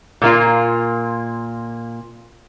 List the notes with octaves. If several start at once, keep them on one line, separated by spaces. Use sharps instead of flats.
A#2 A#3 F4